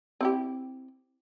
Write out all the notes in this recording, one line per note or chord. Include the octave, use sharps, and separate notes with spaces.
C4 E4 G4